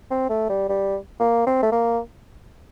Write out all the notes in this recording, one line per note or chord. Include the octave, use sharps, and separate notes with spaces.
C4
A3
G3
G3
A#3
C4
A3
A#3